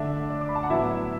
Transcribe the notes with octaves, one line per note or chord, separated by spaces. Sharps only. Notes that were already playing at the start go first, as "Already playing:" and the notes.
Already playing: D3 A3 D4 E5
D5
D6
B5
A5
F#5
A2 F#3 B3 E4 E5